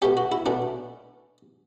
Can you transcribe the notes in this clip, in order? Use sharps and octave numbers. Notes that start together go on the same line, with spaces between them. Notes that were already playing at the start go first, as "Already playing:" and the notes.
B2 A3 C#4 G4
F#4
E4
B2 A3 C#4 D4